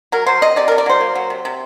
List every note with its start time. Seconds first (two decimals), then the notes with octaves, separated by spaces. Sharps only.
0.12 F#3 A#4
0.26 F#3 C5
0.42 C3 D#5
0.56 C3 D5
0.68 C3 A#4
0.78 D5
0.86 F#3 C5
1.01 A#3
1.15 F#3
1.30 C3
1.45 C3